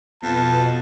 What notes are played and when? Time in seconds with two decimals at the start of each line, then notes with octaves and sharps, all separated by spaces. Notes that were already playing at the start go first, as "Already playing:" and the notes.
0.23 F2 B2 B3 A5